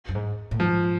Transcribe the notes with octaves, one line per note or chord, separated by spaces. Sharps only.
F#2
G#2
A2
G#2 F3